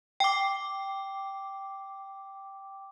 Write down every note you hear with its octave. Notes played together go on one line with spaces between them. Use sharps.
G5 D6